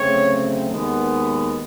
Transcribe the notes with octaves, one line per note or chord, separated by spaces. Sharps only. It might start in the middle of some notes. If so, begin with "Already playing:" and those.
Already playing: D2 C#3 F#3 A3 C4 C#5
D#2 D#3 G#3 B3